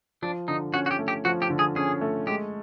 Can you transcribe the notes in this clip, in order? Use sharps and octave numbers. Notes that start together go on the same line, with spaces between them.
F3 D4
D3 D#4
C#4 F#4
F#4
G4
A3
G4
F3 F#4
G4
D3
G#4
C#4 G#4
A3
G#3 G4